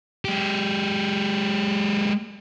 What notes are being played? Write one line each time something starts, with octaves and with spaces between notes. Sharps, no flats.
G#3 G4